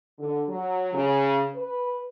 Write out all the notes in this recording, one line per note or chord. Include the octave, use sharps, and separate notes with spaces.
D3
F#3
C#3
B4